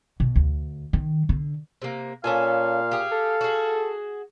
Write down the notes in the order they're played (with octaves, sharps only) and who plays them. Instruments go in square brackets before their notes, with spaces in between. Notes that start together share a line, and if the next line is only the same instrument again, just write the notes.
[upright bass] B2
D2
D#3
D3
[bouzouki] C3 A#3
[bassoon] A#2 [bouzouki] C#4 A4 G#5 [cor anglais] F5
[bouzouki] G4 G#4
[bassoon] A4
[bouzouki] F#4 G#4